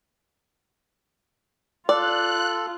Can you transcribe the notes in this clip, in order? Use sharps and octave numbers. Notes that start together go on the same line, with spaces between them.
F4 A4 D5 F#6